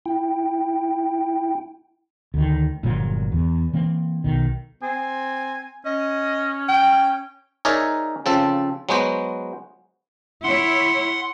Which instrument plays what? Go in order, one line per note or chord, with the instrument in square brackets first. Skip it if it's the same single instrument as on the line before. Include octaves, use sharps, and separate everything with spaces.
[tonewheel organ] E4 G5
[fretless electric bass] D2 D#3
G1 A#2 F3 F#3
E2
E3 A#3 C4
B1 D#3
[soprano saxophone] C4 [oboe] G#5
[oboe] C#4 [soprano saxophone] D#5
[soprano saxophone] G5
[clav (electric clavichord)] D#4 G#4 A#4 C#5 D5 E5
C#3 F3 C4 A4
F#3 G#3 B3 F#4 C5
[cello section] E4 C#5 [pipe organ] F#5 C6